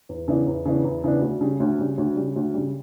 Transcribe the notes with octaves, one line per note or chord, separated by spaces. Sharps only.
E2
C#3 E3 B3 D4
E2
C#3 E3 B3 D4
E2
C#3 E3 B3 D4
D2
C#3 G3
D2
C#3 G3
D2
C#3 G3
D2
C#3 G3